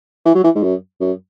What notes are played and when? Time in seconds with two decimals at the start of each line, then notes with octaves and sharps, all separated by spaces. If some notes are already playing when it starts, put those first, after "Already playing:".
0.25 E3
0.35 F#3
0.44 E3
0.55 G#2
0.63 F#2
1.01 F#2